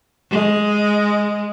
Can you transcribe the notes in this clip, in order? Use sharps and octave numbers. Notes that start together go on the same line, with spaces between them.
G#3